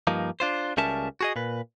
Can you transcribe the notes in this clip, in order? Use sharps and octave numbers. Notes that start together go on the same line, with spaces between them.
G2 F3 A#3 D#4
D4 F4 C5
C#2 G3 C#4 A#4 E5 A5
F#4 G#4 D#5
A#2 B4